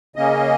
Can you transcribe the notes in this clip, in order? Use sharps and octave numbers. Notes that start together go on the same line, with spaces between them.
C#3 A#3 C#4 D#5